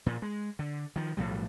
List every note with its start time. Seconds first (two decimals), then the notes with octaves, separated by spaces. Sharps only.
0.06 A#2 F3
0.22 G#3
0.59 D3
0.96 D#3 F3
1.17 B1 A2 F3 G3